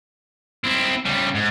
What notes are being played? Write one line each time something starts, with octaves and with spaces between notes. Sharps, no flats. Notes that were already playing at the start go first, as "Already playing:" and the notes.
C4 E4
C#3 G3
G#2